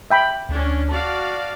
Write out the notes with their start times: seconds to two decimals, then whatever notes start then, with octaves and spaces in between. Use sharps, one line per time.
0.10 E5 G5 B5
0.49 D2 C#4 D4
0.89 F#4 D5 F5 A5